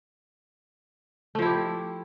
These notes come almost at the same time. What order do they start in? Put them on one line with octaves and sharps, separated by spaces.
A3 F3 E4 G4